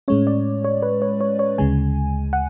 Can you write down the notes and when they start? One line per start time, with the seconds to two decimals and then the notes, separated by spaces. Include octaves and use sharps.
0.08 A2 G#3 C#4 C#5
0.27 D5
0.64 C#5
0.83 B4
1.02 C#5
1.21 C#5
1.39 C#5
1.58 D2 C#3 G#3 G#5
2.33 F#5